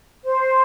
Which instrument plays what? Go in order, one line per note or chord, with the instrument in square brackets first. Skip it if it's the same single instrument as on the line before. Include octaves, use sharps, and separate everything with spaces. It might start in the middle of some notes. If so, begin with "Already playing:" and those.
[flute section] C5